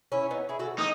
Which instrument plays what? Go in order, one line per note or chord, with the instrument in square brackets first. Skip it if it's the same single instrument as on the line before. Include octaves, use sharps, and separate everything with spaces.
[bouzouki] C#4 E4
B3 D#4
E4 G#4
F#4 A4
[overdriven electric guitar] D#4